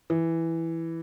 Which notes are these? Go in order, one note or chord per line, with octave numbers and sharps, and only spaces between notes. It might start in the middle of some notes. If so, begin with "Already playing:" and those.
E3